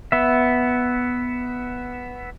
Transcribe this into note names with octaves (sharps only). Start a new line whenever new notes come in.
B3 E5